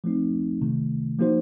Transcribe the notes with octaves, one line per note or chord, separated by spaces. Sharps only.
F3 A3 C4 D#4
C3 D#3 A3
F3 A#3 D#4 F#4 C5